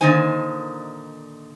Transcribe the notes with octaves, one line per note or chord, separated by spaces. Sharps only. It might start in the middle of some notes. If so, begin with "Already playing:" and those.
A#2 D3 D#3 D#4 C5 G#5